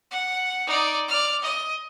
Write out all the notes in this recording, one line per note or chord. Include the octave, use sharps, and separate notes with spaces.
F#5
D#4 D5
D5 F6
D#5